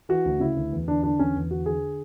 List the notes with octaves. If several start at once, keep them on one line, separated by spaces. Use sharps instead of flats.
E3 F#4
D2
C#3 E4
D2
E2
D3 D4
D3 D4
E2 C#4
E2
D3 F#4
D3 G#4